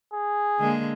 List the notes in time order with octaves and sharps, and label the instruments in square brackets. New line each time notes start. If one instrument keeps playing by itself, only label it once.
[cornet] G#4
[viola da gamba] D3 G#3 A#3